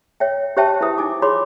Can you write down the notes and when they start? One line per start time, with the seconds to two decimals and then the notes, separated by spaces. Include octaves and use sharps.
0.20 C#5 E5 G5
0.57 G4 C5 C#5 E5 G5 A5
0.81 E4 B4 C5 E5 D#6
0.98 D#4 G#5 D6
1.22 F4 G#4 C#5 B5 C6 D6